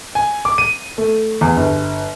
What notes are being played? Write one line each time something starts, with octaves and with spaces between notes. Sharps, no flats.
G#5
D6
D#7
A3
E2
G1